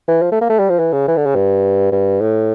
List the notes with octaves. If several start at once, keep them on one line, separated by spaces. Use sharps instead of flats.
E3
F3
A3
A#3
A3
G3
F3
E3
C#3
E3
D3
C#3
G2
G2
A2